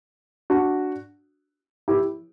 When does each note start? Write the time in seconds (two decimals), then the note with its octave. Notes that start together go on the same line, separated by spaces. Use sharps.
0.50 D4 F#4
1.88 E4 G4